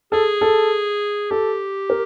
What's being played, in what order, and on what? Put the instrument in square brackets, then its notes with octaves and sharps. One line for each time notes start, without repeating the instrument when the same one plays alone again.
[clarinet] G#4 [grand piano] A4
[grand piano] A4
[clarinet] G4 [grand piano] A4
[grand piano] A#4